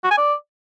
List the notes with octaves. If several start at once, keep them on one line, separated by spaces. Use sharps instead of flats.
F#4
G#5
D5